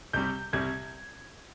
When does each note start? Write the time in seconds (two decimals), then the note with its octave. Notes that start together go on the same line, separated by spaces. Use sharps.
0.13 C2 C3 G3 G6
0.53 C2 C3 G3 G#6